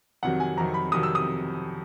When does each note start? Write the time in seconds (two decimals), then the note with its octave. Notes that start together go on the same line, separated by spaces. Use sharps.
0.23 F2 C3 D#3 F#3 F#5
0.40 G#5
0.57 F2 C3 D#3 F#3 A#5
0.74 B5
0.92 F2 C3 D#3 F#3 D#6
1.03 E6
1.15 D#6